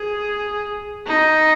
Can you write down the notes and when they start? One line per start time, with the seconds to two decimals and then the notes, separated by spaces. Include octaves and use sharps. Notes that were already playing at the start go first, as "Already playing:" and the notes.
Already playing: G#4
1.07 D#4